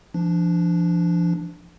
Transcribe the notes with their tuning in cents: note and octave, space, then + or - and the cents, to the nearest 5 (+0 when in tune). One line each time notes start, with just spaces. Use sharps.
F3 -35 D4 +0